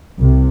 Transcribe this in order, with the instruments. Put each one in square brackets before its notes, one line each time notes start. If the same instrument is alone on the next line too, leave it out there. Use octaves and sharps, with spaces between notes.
[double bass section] C2 C3